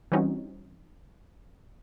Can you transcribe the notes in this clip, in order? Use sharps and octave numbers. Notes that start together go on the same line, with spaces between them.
E3 G3 C4 C#4 D#4 F#4